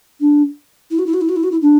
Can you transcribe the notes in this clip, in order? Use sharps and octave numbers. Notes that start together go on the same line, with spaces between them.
D4
E4
F#4
E4
F#4
E4
F#4
E4
F#4
E4
D4